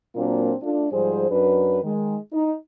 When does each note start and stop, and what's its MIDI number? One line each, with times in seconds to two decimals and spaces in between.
0.15 0.52 46
0.15 0.52 54
0.15 0.52 58
0.15 0.52 60
0.15 0.52 62
0.15 0.52 65
0.62 0.85 57
0.62 0.85 62
0.62 0.85 65
0.91 1.26 44
0.91 1.26 53
0.91 1.26 55
0.91 1.26 68
0.91 1.26 72
1.30 1.81 42
1.30 1.81 54
1.30 1.81 62
1.30 1.81 71
1.83 2.16 51
1.83 2.16 56
2.32 2.53 63